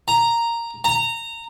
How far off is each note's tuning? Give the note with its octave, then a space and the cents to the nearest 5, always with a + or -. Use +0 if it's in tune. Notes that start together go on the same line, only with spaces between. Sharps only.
A#5 -5
A#5 -20